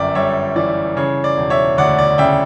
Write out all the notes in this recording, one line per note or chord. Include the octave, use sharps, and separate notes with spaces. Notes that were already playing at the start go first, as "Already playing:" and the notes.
Already playing: G1 F#2 D5 E5 G5
G3 C#5 E5
E3 D5
C#3 C#5
D5
E1
C#5 E5
D2 D5 F#5
D5
C#3 E5 G5